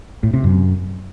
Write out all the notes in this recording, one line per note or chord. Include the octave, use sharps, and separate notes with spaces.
A2
C3
F#2